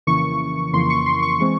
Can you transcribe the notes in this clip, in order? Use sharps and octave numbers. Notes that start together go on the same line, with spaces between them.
F2 C#3 E3 A#3 C#6
F2 C#3 E3 A#3 C6
C#6
C6
C#6
E3 G#3 C4